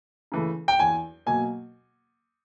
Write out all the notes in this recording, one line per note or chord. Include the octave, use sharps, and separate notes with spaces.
C#3 E3 A3
G5
E2 G#5
B2 F#3 A#3 G#5